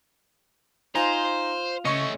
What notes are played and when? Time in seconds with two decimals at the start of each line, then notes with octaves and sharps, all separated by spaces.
0.95 D#4 F4 C5 G#5 A#5
1.85 C#3 A3 C#4 D#5 C#6